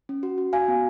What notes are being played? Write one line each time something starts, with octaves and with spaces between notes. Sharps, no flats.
C#4
F#4
F#4
F#4 F5 G#5
B3